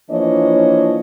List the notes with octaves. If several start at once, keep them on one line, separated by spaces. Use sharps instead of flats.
E3 F3 A#3 D4 C#5 D#5